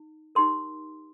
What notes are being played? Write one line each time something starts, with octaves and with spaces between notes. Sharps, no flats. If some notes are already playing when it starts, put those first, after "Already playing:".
Already playing: D#4
D#4 G4 A#4 C6